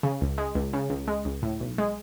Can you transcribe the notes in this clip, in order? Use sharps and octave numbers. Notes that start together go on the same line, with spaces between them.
C#3
C#2
G#3
C#2
C#3
C#2
G#3
C#2
A2
B1
G#3